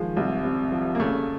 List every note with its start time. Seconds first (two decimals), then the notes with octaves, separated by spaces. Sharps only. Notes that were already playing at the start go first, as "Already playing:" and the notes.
Already playing: D#3 F3 G#3
0.17 C2
0.44 C3
0.72 F3
0.95 A#3
1.00 C#3 A3